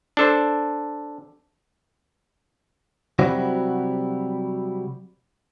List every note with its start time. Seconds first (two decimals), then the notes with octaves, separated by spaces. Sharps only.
0.17 D4 A4 C5
3.19 C3 F#3 G3 C4 E4 F#4